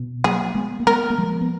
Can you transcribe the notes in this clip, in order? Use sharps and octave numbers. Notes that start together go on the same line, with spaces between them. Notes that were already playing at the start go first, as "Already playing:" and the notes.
Already playing: B2
F#3 A#3 G#4
G#3 B3
A#3
G#3 B3 A#4
A#3
F3 G#3
B3